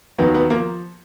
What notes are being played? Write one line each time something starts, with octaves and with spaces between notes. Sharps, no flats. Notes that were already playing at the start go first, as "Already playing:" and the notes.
D#2 D#3 F#3 B3
B3
F3 A#3